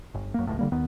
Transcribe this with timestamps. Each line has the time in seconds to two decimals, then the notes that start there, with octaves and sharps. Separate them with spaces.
0.14 G1
0.34 F#2 A#3
0.47 F#1 C#2 A2
0.59 D3 G3 A#3
0.72 D#2 D#3 B3